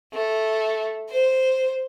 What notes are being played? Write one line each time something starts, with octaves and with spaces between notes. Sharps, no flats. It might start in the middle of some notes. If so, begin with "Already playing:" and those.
A3
C5